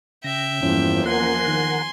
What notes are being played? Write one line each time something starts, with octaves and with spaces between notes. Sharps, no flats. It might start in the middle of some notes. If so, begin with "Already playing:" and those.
C#3 E5 G5 A#6
E2 G2 E3 F3 A#3 C#4
A#4 F#5 G#5 C6
D#3